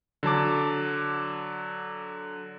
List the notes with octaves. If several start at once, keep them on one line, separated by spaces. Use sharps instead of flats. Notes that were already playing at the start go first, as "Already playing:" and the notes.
D3 F#3 A5 D6